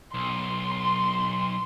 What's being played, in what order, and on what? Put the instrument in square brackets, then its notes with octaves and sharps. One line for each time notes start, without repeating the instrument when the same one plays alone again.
[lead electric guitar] B1 [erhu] C6